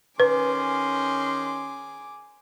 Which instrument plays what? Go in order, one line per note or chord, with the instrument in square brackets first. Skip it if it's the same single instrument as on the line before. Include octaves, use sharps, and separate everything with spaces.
[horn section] D#3 C#4 C6 [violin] G#4 D6 [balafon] B4